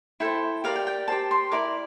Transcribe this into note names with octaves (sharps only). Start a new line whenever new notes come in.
E4 A4 C5 G5
G4 A#4 D5 F5
G5
G5
G4 C5 A5
C6
E4 A#4 D5 D6